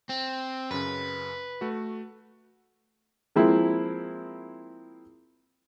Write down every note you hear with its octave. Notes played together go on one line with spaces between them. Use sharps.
C4
F#2 C#3 B4
A3 F#4
F3 G#3 A#3 C4 E4